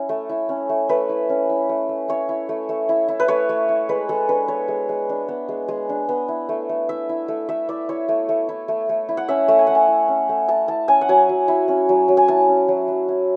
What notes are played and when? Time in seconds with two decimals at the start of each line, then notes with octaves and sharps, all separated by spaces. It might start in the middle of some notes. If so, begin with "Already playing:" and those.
Already playing: C#4 E4
0.09 A3
0.29 E4
0.49 C#4
0.69 A3
0.89 A3 B4
1.09 E4
1.29 C#4
1.49 E4
1.69 A3
1.89 A3
2.08 E4 C#5
2.29 E4
2.49 A3
2.69 A3
2.89 E4
3.08 E4
3.20 B4
3.28 A3 C#5
3.49 A3
3.69 E4
3.89 G#3 B4
4.09 G#3 A4
4.29 D4 B4
4.48 B3 C#5
4.68 G#3
4.89 G#3
5.09 D4
5.28 B3
5.49 G#3
5.68 G#3
5.89 D4
6.09 B3
6.28 E4
6.49 A3
6.69 A3
6.89 E4 E5
7.09 E4
7.28 A3
7.49 A3 E5
7.69 E4 D5
7.89 E4 C#5
8.08 A3
8.29 A3
8.49 E4
8.68 A3
8.89 A3
9.09 E4
9.17 F#5
9.28 C#4 E5
9.48 A3
9.59 G#5
9.67 A3 F#5
9.75 G#5
9.88 E4
10.08 C#4
10.29 A3
10.48 A3 A5
10.68 E4 A5
10.88 C#4 G#5
11.01 F#5
11.09 F#3 G#5
11.29 F#3
11.48 E4
11.68 C#4
11.89 F#3
12.08 F#3
12.17 G#5
12.28 E4 A5
12.48 C#4
12.68 F#3
12.88 F#3
13.08 E4